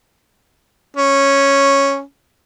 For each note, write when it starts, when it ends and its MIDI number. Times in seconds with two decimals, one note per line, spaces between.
0.97 2.00 61